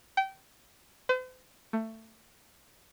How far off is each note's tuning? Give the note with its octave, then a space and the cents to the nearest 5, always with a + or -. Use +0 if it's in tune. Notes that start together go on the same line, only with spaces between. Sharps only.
G5 -25
C5 -45
A3 +20